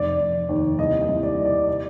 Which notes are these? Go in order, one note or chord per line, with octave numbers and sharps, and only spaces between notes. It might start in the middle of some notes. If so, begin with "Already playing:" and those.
Already playing: F1 D5
F1
D#2
C2 D#5
D#5
C2
D5
C3
D5
D5